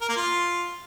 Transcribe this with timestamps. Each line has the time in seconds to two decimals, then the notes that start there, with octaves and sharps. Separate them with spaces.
0.01 A#4
0.09 A#3
0.17 F4